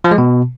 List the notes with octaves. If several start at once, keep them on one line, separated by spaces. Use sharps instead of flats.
F3
G#3
B2